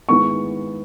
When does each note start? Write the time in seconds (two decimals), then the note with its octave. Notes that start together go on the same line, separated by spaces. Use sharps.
0.08 D#3 G#3 B3 E4 C#6